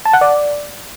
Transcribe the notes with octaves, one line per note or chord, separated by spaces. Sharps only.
A5
F#5
D5